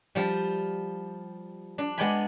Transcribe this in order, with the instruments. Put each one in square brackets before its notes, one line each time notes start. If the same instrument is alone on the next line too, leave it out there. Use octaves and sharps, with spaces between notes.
[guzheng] F3 G3
D4
G#3 B3 D5 G5 G#5 B5